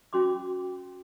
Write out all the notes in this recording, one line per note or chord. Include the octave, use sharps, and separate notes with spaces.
C#4 F#4 C6 D6